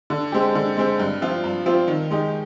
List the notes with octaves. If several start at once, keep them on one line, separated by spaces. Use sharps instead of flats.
D3
G#3 C4 G4
D3
G#3 C4 G4
G2
F3 C4 F4
G2
F3 C4 F4
D#3
G#3 D#4 G4